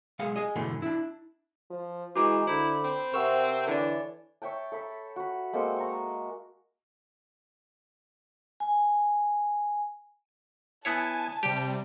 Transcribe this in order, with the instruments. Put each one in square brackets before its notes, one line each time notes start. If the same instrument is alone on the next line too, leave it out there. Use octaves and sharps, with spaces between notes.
[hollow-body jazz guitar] B1 G#3 G#4 F5 F#5
G#4 D#5
G#2 B2 D3 E3 A3
D4 E4
[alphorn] F3
[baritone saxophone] E3 [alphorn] G#3 [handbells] F#4 A#5 D7 [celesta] D6
[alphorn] D3 [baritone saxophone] E4 [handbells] C5 B5
[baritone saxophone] C4
[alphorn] C3 [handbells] A#4 E6 [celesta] E5 F#5 C#6
[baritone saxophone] D3 [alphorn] E3 [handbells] C#5 D5
[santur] C#5 E5 G5 A5
A4 E5 B5
F#4 B5
G#3 A#3 C4 A4
A#5 C#6
[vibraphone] G#5
[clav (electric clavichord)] B3 E4 C#5 [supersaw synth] G#5 [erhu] A5
[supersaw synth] C3 G3 [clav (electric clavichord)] G4